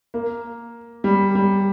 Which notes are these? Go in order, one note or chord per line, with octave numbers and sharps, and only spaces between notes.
A#3
G3
G3